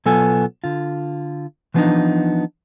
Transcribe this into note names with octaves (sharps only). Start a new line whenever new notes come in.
B2 F#3 B3 F4 A4 G#5
D3 F4
E3 F3 B3 C4 D4 D#4